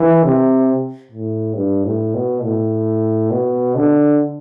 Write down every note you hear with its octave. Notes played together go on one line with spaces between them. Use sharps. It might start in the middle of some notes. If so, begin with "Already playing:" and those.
Already playing: E3
C3
A2
G2
A2
B2
A2
B2
D3